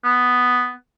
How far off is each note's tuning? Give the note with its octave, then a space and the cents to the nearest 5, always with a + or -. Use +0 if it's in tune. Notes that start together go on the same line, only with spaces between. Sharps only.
B3 +5